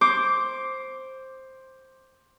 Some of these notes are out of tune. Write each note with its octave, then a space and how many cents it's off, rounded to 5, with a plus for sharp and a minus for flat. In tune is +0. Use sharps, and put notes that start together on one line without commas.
C5 +10 D6 -5